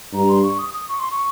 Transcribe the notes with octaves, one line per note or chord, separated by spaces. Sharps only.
G2 A#5
C6
C#6
D#6
D#6
C#6
C6
C#6